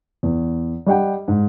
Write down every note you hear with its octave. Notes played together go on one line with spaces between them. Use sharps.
E2
G3 G4 D#5 F#5 G5
G#2